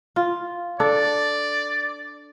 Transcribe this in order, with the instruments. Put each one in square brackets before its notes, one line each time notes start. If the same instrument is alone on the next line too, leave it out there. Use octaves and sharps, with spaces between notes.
[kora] F4
[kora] D4 A4 [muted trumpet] D5